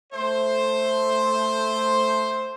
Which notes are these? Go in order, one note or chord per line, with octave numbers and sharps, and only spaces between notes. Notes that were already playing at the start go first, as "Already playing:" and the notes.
A3 C5